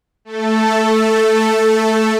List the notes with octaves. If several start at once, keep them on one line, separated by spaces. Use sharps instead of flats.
A3 A4